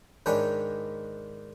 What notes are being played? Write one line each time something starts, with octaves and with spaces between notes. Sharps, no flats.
G#2 D#3 D4 C#5 G#5 B5